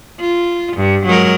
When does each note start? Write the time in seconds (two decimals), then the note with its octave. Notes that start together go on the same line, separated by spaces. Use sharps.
0.20 F4
0.77 G2
1.06 F#3 G#3 A#4